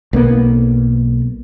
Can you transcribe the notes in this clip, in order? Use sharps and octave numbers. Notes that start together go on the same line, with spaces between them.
B1 A#3 B3